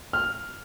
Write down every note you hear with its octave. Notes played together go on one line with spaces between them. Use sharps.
F6